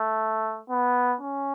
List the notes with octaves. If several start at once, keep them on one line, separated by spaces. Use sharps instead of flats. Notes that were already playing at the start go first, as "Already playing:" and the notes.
Already playing: A3
B3
C#4